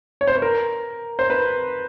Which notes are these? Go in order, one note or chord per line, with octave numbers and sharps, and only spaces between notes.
C#5
C5
B4
A#4
C5
B4